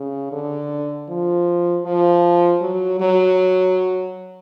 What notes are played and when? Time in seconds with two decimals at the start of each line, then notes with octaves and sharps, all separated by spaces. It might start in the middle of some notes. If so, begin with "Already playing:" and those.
Already playing: C#3
0.32 D3
1.09 F3
1.85 F3
2.62 F#3
3.00 F#3